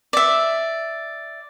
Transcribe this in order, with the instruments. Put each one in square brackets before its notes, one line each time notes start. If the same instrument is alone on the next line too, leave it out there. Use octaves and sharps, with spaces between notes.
[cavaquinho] D5 E5